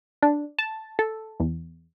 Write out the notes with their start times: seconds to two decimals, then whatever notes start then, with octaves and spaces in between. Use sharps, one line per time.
0.22 D4
0.59 A5
0.99 A4
1.40 E2